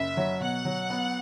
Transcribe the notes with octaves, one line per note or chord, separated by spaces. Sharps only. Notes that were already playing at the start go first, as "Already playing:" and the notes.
Already playing: F#1 E5
F#3
B2 F#5
F#3
B3